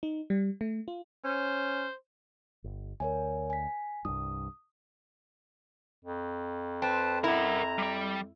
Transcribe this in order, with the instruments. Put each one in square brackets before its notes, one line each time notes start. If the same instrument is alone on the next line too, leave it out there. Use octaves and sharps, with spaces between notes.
[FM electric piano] D#4
G3
A3
F4
[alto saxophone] C#4 [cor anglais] C5
[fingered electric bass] G1
[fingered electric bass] D2 [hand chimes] A#4 C#5 G#5
[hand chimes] G#5 B6
[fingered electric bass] C2 G2 [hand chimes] D#6
[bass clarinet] F2
[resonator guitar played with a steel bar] C4 [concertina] B4 A5
[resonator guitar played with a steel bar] E4 [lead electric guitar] A#4 F#5 [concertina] A#5
[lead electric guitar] G3 G5